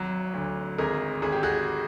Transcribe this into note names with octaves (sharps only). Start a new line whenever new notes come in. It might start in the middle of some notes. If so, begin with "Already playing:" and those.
Already playing: G#1 F#3
D2
G#1 G#4 A#4
G#1 G#4
G4
F#4 G#4